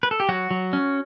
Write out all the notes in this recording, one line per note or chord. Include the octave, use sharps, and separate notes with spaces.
B4
A4
G4
F#3 F#4
F#3
C#4